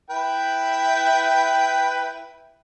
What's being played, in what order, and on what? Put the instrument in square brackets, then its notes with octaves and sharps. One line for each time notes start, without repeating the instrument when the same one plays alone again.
[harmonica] E4 B4 G5